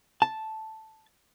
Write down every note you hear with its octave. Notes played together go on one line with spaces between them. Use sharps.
A5